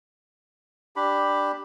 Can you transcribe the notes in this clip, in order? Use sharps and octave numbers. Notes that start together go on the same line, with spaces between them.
D4 G4 B5